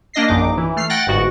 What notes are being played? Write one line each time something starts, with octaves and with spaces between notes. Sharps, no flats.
A#3 D4 D#5 A#6 C7
A#1 F#2 D#4 D6
E3
A3 F6 C7
F#5 G5 F#6 A6 A#6
G1 G#2 F#4